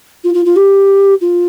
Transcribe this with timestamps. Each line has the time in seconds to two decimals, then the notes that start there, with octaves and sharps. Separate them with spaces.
0.23 F4
0.34 F4
0.45 F4
0.56 G4
1.21 F4